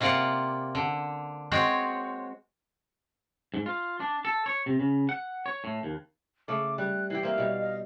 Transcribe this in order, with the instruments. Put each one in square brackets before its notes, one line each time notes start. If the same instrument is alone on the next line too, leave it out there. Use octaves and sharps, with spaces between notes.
[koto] C3 A#3 F4 D5 F#5
D3
G#3 C4 F#4 C#5
[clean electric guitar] G#2
F4
D4
A4
C#5
C3
C#3
F#5
C#5
A2
D#2
[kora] C#3 A3 [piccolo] D6
[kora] G3 [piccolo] F#6
[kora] E3 E4 G4 [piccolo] C7
[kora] A#3 C4 [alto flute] E5 [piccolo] F5
[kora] B2 G3
[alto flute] D#5